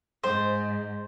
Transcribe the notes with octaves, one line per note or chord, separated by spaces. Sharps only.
G#2 C5